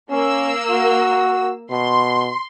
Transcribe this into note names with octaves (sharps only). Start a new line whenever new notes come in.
A#3 C#4 E6
F#4
B2 C6